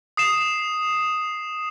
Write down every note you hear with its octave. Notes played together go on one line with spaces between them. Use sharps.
D#6 C7 E7